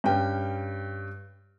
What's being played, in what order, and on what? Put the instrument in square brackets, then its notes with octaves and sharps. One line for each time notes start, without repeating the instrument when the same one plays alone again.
[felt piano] G2 C#4 G5